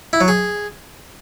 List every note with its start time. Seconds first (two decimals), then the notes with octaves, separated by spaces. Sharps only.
0.13 E4
0.21 F#3
0.28 G#4